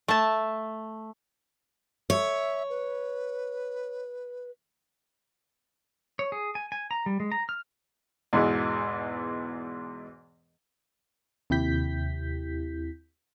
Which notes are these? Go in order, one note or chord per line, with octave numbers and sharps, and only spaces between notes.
A3 A5
C#5 E5
B4
C#5
G#4
G#5
G#5
A#5
G3
G#3
A#5
F6
E2 G#2 B2 E3 G#3
D#2 C3 E4 G4 G6 B6